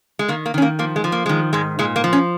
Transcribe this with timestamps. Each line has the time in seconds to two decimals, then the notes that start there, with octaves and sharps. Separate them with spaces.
0.19 G#3
0.28 D#3 A#3
0.46 A#3
0.54 D#3 C#4
0.62 A#3
0.79 F3 A#3
0.96 G#3
1.04 F3
1.12 A#3
1.26 D#3 G#3
1.53 G#2 G#3
1.79 A#2 G#3
1.96 A#3
2.04 F3
2.13 C#4